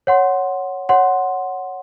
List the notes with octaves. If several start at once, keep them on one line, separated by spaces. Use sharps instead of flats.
C#5 F#5 C6
C#5 F#5 C6